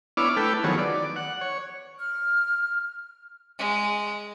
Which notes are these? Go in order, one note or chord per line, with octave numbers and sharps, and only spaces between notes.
B3 D4 E4 C#5 D6 F6
A3 E4 A4 B4 G5
D#3 F3 F#3 B3 G#4 C#5
D5
F#5
C#5
F6
G#3